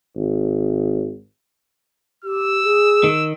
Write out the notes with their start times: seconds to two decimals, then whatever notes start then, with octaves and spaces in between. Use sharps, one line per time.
0.16 G#1
2.24 G4 E6
2.64 G#4
3.04 D#3